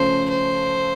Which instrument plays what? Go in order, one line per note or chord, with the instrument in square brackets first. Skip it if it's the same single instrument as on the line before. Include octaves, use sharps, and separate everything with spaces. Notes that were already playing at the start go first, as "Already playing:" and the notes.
Already playing: [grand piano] C#3 F3 A3 C#4 [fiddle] C5
[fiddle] C5